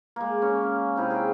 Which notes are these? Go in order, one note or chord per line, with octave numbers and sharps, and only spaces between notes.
G#3 A#3
C#4
C3 D#4 E4
G#4 D#5 E5 G5